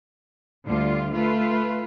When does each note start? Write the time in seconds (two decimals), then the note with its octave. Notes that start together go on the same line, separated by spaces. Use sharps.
0.65 D2 D3 G3 F4
1.13 A3 F4 B4